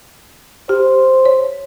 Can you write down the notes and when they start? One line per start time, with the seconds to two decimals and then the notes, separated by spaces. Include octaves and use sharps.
0.69 G4 C5
1.26 C#5